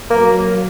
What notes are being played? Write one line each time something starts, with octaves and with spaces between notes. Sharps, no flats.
F#3 A#3